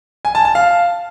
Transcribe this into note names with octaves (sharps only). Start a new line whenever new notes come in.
G#5
A5
A5
F5